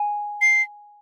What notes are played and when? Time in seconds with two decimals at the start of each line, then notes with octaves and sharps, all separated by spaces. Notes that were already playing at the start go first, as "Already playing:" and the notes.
Already playing: G#5
0.42 C7